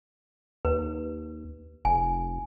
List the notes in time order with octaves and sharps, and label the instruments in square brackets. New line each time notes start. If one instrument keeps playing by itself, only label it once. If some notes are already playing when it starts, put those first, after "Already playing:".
[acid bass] D#2 [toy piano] B4
[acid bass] F1 [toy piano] G#5